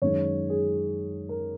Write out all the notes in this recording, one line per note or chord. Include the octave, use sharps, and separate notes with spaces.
F#2 D#3 G#3 C#5
G#4
A#4